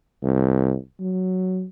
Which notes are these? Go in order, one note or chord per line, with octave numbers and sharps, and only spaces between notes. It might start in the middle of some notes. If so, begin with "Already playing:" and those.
C2
F#3